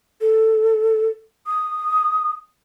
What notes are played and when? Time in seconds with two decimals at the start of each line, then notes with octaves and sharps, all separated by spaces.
0.21 A4
1.47 D#6